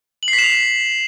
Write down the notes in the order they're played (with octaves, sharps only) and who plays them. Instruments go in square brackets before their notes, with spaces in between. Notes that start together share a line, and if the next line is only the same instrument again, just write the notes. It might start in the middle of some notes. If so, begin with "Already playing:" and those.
[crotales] F#7
C7
B6
E7
F7